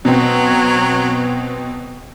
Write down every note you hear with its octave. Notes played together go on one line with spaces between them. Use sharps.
B2 F#3 C4